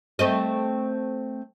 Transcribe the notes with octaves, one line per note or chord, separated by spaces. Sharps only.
A3 C4 D#5